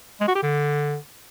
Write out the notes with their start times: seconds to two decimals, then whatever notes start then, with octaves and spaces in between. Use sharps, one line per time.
0.21 G#3
0.28 F#4
0.35 G4
0.42 D3